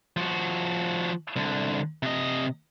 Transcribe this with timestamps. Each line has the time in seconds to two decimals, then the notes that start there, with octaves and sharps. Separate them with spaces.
0.17 F3 F#4
1.36 C2 D3
2.03 C3 D#5